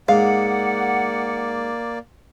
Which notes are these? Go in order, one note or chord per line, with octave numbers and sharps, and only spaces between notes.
G#2 A#3 D5 F5 F#5